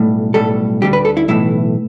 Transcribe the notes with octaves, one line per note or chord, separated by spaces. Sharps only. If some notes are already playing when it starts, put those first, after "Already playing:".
Already playing: B1 A2 G3
B1 A2 G3 A4
D2 D3 G3 G4
B4
A4
E4
B1 A2 E3 E4